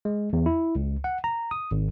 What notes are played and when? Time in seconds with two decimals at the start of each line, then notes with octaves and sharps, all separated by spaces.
0.05 G#3
0.33 E2
0.46 E4
0.75 C#2
1.04 F#5
1.24 A#5
1.51 D#6
1.71 G#1